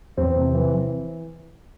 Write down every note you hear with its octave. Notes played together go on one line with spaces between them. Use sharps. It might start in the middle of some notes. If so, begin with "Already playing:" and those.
E2 C4
C3
E3
E3